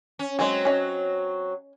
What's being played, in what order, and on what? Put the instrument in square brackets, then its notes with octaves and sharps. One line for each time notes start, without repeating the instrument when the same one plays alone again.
[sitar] C#4
[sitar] F#3 C4 [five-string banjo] G#3 G#4
[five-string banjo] C#4 D#5